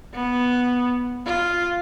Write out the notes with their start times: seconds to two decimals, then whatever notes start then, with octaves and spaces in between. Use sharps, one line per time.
0.14 B3
1.26 F4